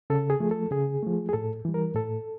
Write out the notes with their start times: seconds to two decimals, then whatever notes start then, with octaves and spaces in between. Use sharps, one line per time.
0.10 C#3 A4
0.30 G#4
0.40 F3 A3
0.51 A4
0.71 C#3 G#4
1.03 F3 A3
1.29 G#4
1.33 A2 A4
1.65 E3 G3
1.74 A#4
1.95 A2 A4